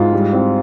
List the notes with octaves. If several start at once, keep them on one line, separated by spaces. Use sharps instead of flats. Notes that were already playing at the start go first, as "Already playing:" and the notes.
Already playing: G#2 F4
G3
C4